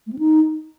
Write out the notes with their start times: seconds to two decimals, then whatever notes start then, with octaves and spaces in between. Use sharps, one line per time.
0.07 A3
0.13 C4
0.19 D#4